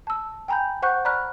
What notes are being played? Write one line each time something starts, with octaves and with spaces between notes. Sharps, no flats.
A5 E6
G5 G#5 A#5 B5 G6
C5 F#5 C#6 F#6 G6
D5 A#5 B5 C#6 F6 F#6